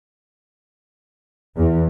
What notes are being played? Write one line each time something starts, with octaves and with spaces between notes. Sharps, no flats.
E2